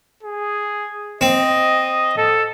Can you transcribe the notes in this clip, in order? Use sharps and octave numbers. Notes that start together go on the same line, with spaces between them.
G#4
C4 D#5
A4